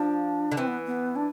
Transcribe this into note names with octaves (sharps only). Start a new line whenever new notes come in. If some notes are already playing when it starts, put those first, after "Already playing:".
Already playing: F3 D4
D3
E3 C4
B3
B3
D4